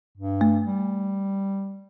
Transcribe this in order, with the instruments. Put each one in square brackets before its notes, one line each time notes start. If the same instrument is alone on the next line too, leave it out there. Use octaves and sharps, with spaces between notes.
[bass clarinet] G2
[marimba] A3
[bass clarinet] G3